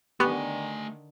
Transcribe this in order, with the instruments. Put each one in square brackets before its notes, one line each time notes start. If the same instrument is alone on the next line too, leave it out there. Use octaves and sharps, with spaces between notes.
[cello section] D3 D#3 [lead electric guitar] A3 G#5 [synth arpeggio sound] B3 [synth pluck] G4 C#6 F#6